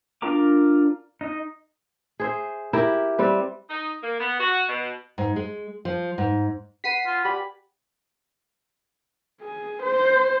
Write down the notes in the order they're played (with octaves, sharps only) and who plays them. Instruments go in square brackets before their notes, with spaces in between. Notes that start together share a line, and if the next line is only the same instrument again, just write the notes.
[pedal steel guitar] D4 F4 A#4 A#5 D6
D#4 D#5
[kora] G#4 C5 E5
E4 G4 A#4 E5
G3 C4 B4
[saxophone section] D#4
A#3
B3
F#4
B2
[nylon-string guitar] G#2
G#3
F3
G#2
[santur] B4 F#5 [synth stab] B6 C7 D#7
[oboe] F4
[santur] G4 D5 G#5 [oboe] B5
[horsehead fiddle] G#4
C5